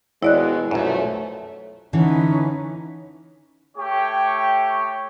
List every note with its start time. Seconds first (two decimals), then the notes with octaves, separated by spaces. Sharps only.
0.22 D#2 B2 G#3 E4 D5 F#6
0.71 B1 F#2 F3 A3
1.93 D3 E3 C#4 D#4 B4
3.76 A3 G4 C#5 G5 C#6